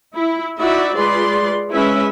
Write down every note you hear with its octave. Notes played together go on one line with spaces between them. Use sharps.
E4
D#4 E4 F#4 D5 E5
G#3 F4 G#4 B4 D5 C6
G#3 C#4 E4 B4 E5